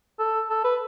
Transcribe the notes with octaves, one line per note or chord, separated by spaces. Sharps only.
A4
A4
B4